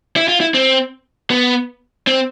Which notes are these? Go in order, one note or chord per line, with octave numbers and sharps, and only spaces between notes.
E4
F4
E4
C4
B3
C4